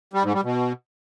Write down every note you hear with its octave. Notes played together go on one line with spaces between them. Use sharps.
G3
G#2
G3
B2